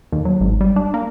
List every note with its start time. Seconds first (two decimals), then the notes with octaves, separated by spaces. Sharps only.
0.12 D#2
0.25 F#3
0.41 G#1
0.61 G3
0.76 D4
0.94 A#3